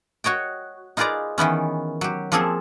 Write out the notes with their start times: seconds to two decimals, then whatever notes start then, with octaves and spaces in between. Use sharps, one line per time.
0.24 F#4 C#5 D#5 G5
0.97 D#4 F4 G#4 B4 D5 A#5
1.38 D#3 E3 B3 C#4
2.01 F#3 G4
2.32 F3 A#3 C4 G#4 A4